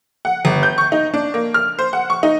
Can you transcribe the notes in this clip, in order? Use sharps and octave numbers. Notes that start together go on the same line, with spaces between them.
F#5
G1
G6
C#6
D#4
D4
A#3
F6
C5
F#5
C#6
D#4